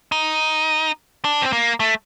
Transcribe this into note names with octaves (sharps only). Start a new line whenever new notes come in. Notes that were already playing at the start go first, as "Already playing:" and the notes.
D#4
D4
C4
A#3
A3